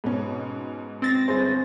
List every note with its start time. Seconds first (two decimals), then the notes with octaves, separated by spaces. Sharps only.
0.04 G#2 B2 C#4
1.02 C4 A6 A#6
1.28 G1 G#4 C5